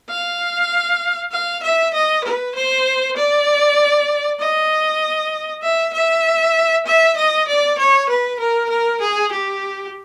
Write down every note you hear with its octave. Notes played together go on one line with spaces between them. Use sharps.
F5
F5
E5
D#5
B4
C5
D5
D#5
E5
E5
E5
D#5
D5
C#5
B4
A#4
A#4
G#4
G4